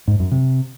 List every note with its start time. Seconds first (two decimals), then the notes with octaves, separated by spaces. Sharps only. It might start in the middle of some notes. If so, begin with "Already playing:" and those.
0.08 G#2
0.19 F#2
0.31 C3